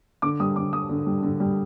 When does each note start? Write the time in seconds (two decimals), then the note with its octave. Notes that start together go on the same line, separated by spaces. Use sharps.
0.22 D3 D6
0.40 G3 D#6
0.56 D3 D6
0.73 G3 D#6
0.89 D3
1.06 G3
1.23 D3
1.40 G3